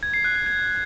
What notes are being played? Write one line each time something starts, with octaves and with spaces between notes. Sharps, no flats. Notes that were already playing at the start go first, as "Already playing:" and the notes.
G#6
C7
F#6
G#6
G#6